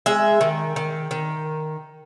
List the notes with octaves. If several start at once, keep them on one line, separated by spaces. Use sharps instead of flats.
G#3 E5
D#3
D#3
D#3